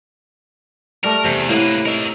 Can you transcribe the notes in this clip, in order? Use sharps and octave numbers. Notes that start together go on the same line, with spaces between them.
G3 A3 A#4
E2 C3
A2 A#3 B4 F5 F#5
D#4 A#4 E5